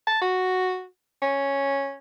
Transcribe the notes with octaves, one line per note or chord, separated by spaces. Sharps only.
A5
F#4
C#4